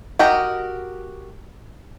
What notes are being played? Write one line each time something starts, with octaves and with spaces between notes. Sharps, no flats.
F#4 G4 A#4 D#5